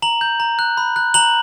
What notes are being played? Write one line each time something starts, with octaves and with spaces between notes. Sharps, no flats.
A#5 F#7
G6
A#5
F#6
B5
F#6
A#5 F#7